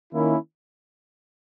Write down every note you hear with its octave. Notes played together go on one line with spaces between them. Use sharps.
D#3 A#3 C#4 E4